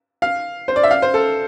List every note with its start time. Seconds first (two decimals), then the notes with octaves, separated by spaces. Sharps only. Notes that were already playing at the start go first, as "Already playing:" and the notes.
0.22 F5
0.68 C5
0.76 D5
0.83 E5
0.91 F5
1.02 C5
1.14 A4